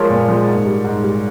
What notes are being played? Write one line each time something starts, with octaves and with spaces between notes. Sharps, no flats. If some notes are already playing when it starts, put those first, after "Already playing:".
Already playing: F3 G#3 A#4 C#5
A#2
F3 G#3
G#2
G3
G#2
G3